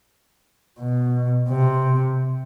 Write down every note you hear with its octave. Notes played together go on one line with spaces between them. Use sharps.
B2
C3